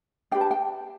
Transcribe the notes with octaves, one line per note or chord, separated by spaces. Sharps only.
D4 G4 B4 G5
A5
G5